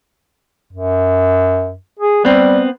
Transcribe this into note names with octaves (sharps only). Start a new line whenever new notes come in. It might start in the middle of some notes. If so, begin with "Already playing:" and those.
F#2
G#4
G3 B3 C4